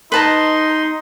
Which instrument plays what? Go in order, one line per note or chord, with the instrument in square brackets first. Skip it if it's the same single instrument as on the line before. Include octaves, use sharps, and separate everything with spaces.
[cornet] D#4 [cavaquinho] B4 A5 A#5 [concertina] C6